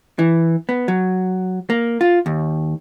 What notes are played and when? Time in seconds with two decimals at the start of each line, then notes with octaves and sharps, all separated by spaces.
0.19 E3
0.69 B3
0.88 F#3
1.70 A#3
2.01 F4
2.26 D#2